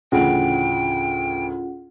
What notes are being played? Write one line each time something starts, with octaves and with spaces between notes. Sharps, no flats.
A1 D2 C#3 C#4 F4 G#4 F#5 G5